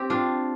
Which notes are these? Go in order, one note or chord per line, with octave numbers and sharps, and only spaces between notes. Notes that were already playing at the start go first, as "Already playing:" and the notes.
Already playing: C4 G4
D4 F4